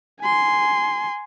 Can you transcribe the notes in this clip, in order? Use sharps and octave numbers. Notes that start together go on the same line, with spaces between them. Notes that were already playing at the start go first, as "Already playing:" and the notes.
G#5 C6